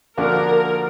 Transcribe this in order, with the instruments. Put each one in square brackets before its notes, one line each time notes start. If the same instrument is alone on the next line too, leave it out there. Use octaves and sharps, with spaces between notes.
[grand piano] D3 F3 A#3 D4 F#4 [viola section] A#4